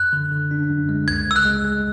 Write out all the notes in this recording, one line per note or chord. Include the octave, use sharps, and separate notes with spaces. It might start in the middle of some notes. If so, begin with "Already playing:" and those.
Already playing: F#2 F#6
D3
D3
D4
F#2
G#3
C#2 G#6
C#2 E6
F#6
G#3
G#3